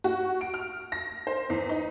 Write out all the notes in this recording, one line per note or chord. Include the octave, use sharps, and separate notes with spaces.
F#4
D7
F6
A#6
C5
E2
D#4